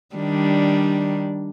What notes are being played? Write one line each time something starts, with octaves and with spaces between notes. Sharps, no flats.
D#3 G3 D4